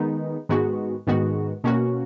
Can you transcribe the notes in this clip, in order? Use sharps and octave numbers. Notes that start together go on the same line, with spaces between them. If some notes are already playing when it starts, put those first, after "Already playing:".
Already playing: D#3 G#3 B3 D#4
G#2 D#3 G#3 B3 F#4
G#2 D#3 G#3 B3 F#4
B2 A#3 C#4 F#4